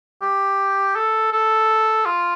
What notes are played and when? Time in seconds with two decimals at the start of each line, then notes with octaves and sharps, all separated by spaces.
0.22 G4
0.96 A4
1.32 A4
2.06 F4